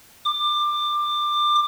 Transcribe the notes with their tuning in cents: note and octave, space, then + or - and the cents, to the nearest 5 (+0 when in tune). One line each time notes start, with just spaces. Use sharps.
D6 +20